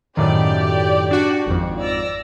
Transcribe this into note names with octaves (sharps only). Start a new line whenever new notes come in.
F#2 A2 D#3 G4 D5 G5
D4 F#4
G#1 F2
D5 E6 A#6